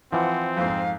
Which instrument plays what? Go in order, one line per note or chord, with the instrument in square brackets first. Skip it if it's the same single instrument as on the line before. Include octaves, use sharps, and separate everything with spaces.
[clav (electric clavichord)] E3 F3 [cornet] C4 [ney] F#5
[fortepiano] F2 G#2 [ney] F5